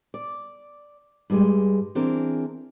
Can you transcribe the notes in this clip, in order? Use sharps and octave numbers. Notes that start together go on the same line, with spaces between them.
D5
G2 G3 G#3
E3 C4 D4 G#4 A#4